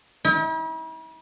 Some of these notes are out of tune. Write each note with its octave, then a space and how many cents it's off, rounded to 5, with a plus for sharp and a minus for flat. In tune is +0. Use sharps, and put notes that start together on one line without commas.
E4 -45